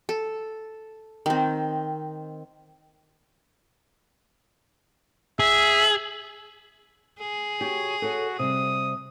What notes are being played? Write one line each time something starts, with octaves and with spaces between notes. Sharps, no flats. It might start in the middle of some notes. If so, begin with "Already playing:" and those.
A4
D#3 C4
G#4 E5
G#4
F#4 G4 C#5
F#4 A4 C#5
C3 G3 D#6